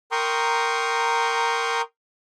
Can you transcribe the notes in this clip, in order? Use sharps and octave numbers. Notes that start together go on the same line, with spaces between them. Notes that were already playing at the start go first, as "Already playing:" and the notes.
A#4 G5 A#5 C6 C#6 D#6